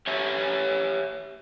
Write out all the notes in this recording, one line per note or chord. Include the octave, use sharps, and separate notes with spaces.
G4 C#5 E5 G#5